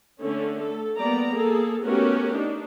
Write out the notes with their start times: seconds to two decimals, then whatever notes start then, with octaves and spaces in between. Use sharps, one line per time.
0.21 D3 A3 C#4
0.61 A4
0.97 G3 A#3 B3 D5 A#5
1.31 A#3 G#4 A4
1.83 A3 B3 C#4 F#4 G4 A#4
2.35 D4 D#4